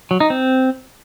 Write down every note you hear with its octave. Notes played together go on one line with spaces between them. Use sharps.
F#3
D#4
C4